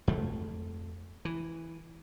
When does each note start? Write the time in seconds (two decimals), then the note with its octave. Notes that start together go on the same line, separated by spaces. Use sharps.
0.08 F2 A3
1.25 E3